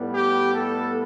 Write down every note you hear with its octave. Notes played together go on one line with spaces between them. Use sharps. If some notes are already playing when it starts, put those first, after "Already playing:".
Already playing: A2 G3 B3
G4
A4